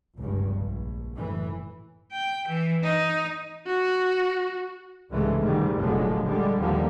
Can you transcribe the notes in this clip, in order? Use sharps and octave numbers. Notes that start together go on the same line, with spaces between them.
F1 C#2 G2
A#1
F#1 F#2 A2 E3
G5
E3
D#4
F#4
C2 G#2 C#3 E3 G#3 A3
G#2 B2 D#3 G3
F1 A#1 D3 F3 F#3 G#3
D3 G3 G#3
D#2 D3 F3 G3 A#3